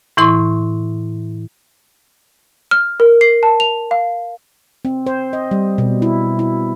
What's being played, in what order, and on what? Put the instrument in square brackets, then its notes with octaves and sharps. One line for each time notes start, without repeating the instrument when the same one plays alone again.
[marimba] A2 E3 E4 C6 C#6
[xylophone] F6
A#4
C7
A5
F7
F5
[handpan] C4
C5
D#5
G3
B2
E4
E4